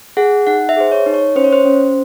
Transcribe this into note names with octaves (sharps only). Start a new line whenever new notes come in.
G#4 F#5
D#4 F#5
E5
G#4 C5
C#5
D#4
C#5
C#4 C5
C#5
C5
C#4